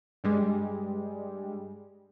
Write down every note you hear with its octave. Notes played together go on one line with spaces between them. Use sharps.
G2 G3 G#3